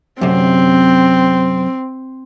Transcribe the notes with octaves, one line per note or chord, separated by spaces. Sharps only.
F#2 C3 C4